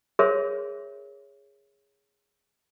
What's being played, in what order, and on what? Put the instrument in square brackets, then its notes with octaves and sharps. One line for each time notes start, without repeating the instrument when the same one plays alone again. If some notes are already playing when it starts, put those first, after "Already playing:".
[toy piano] G#4 A#4 C5 C#5 E5